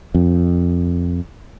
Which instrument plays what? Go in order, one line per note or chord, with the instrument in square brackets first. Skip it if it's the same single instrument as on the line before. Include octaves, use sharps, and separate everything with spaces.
[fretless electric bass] F2